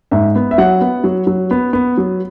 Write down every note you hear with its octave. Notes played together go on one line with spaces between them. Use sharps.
G#2 E5
B3
E5
F#3 F#5
B3
F#3
F#3
B3
B3
F#3